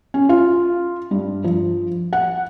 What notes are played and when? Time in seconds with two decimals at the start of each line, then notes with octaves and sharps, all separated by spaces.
0.14 C#4
0.29 F4
1.11 G2
1.44 F3
2.13 F#5